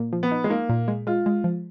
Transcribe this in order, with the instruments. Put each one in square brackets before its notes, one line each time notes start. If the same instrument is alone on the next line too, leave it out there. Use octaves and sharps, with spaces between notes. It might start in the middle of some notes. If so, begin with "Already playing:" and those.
Already playing: [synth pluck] A#2
F3
[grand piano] B3
[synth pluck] D#4
[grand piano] G#3
[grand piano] A#3 [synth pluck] D#4
[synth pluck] A#2
G#3
[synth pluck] G#3 [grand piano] F4
[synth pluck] G#3
F3